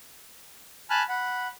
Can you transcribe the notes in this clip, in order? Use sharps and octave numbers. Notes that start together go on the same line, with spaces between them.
G#5 A5 B5 F6 F#6
F#5 B5